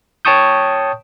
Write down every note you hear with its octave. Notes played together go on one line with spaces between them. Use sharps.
C#5 G5 A5 C#6 D#6 G6